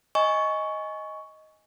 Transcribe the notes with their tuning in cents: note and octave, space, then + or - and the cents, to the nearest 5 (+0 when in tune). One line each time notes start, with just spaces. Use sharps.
D#5 +10 G#5 +0 C#6 +5